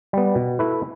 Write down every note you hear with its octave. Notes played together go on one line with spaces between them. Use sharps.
G3 B3
B2
A3 E4 B4